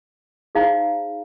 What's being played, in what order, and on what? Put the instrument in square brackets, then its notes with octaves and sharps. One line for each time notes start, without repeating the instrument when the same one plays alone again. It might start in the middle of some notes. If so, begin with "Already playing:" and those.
[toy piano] D#4 G#4 C5 F5 A#5